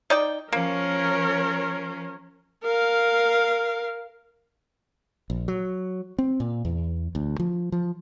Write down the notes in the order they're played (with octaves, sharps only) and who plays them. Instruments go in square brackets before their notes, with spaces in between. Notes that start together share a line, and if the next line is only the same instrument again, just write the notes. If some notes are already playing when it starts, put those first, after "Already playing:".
[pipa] D#4 D5 G5
[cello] F3 C#4 [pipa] A#3 [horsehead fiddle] A#4 C#5
[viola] A#4 F5
[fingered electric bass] A#1
F#3
C4
A#2
E2
D2
F3
F3